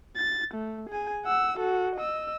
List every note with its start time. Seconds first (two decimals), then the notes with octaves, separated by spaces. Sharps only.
0.16 A6
0.54 A3
0.90 G#4 G#5
1.25 F#5 E6
1.58 F#4 A4
1.96 D#5 E6